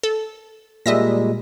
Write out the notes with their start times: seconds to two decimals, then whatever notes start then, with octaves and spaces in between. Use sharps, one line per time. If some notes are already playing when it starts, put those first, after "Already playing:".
0.03 A4
0.86 A#2 G3 G#3 D#5 E5 A#6